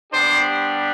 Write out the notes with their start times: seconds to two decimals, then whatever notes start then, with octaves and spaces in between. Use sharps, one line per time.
0.13 G3 B3 D4 G4 C5